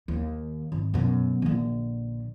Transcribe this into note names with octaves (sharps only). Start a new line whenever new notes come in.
D#2
G#1
F#2 B2
A#1 D3